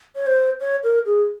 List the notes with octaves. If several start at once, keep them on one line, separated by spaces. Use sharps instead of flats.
C#5
C5
C#5
A#4
G#4